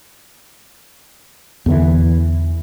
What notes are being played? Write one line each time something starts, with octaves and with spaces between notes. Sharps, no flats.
E2 D3 E3